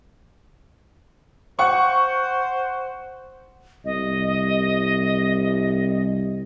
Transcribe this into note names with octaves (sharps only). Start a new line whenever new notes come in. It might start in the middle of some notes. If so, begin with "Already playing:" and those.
C5 F#5 C#6
C2 D#5